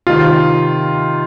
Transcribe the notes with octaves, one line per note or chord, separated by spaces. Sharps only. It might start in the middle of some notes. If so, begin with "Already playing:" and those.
C3 D#3 F4